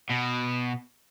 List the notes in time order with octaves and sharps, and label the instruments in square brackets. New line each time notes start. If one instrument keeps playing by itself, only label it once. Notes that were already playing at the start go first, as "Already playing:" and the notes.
[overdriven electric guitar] B2